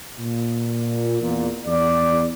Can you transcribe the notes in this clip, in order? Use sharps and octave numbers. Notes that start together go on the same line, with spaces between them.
A#2
E2 A#2
E2 D5